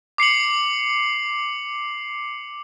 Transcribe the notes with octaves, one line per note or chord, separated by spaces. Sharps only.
D6 C7 C#7 F#7